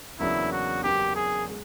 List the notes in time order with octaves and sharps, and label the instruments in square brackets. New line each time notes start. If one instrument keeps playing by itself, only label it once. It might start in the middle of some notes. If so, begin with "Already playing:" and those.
[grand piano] E2 C#3 F#3 A#3 D4 [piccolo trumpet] E4
[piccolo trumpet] F#4
[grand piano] E2 C#3 F#3 A#3 D4 [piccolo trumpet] G4
[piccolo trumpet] G#4
[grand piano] G#3